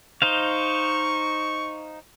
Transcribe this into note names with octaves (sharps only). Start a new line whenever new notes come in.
D#4 C5 F5 C#6